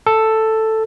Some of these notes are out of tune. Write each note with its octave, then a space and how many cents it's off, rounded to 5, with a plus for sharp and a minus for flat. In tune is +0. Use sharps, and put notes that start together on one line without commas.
A4 +5